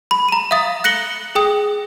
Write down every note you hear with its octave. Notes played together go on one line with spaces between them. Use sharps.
B5
A#5 D#7
E5 F5 D#6 A6
F#6 A#6 C#7 F#7 G7
G#4 G5 D#6